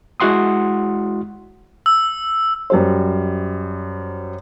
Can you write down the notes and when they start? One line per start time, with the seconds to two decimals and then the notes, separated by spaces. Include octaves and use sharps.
0.20 G#3 E4 F#4 F#5 C6 D#6
1.86 E6
2.70 F#2 G3 C5